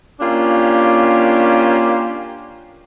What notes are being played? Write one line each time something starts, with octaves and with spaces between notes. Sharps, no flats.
A#3 C#4 D4 F4 G4